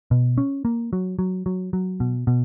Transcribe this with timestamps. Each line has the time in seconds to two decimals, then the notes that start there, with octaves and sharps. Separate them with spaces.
0.11 B2
0.38 C#4
0.65 A#3
0.93 F#3
1.19 F#3
1.46 F#3
1.73 F#3
2.00 B2
2.27 B2